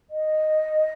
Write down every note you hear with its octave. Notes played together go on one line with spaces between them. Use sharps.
D#5